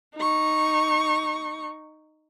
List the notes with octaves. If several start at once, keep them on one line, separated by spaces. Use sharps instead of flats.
D#4 C#6